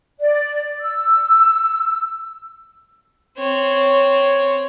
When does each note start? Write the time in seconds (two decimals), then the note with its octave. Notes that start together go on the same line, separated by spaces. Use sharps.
0.19 D5
0.81 E6
3.38 C4 C#5